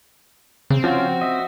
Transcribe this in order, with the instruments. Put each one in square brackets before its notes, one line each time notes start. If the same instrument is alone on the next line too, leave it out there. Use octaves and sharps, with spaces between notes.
[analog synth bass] C#3 [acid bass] C4
[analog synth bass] F3 [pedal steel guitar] C#4 F4 [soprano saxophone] F#4
[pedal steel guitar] D#5 E5